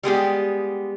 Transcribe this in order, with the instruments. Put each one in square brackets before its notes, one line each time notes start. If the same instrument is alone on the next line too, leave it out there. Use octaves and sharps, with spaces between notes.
[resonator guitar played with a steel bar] G3 G#3 B3 G4